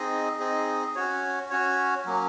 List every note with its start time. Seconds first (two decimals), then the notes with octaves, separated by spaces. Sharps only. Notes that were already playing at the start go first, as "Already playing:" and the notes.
Already playing: C4 D#4 G#4 D#5
0.39 C4 D#4 G#4 D#5
0.95 C#4 F#4 C#5
1.50 C#4 F#4 C#5
2.05 F#3 A#3 C#4